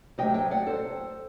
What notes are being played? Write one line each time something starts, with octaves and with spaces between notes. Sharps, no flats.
C3 F#3 A3 D#5 G5
D#5 G5
D5 F#5
A4 C5